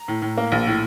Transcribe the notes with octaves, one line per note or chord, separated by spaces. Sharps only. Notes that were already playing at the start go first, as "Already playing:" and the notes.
Already playing: A#5
A2
A2
A#3
A#1
A2